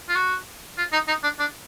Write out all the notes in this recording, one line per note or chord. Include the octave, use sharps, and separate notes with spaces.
F4
F#4
F4
D#4
D#4
D4
D4